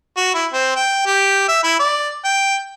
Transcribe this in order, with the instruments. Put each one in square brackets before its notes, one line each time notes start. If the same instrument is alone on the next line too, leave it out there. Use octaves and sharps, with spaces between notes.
[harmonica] F#4
E4
C4
G5
G4
E5
E4
D5
G5